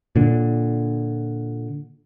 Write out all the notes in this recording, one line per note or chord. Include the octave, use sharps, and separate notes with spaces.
A#2 D3